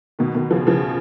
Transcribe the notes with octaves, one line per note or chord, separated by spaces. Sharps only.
B2 D#3
B2 D#3
C#3 F3
C#3 F3